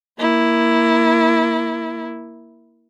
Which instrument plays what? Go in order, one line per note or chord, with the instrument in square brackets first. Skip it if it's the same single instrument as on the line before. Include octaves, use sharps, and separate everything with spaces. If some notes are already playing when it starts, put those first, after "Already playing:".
[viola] A#3 E4